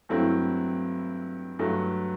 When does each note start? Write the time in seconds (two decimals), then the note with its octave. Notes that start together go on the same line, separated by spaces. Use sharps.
0.09 G2 F#3 A3 C4 E4
1.59 G2 F#3 A3